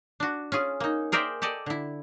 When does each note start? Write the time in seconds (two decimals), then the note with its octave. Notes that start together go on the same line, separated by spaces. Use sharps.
0.20 D4 F#4
0.52 C#4 F4 G#4
0.80 A#3 D#4
1.12 G#4 A#4 C5 D5 E5 G5
1.42 G4 A4 D5 D#5
1.66 D3 E4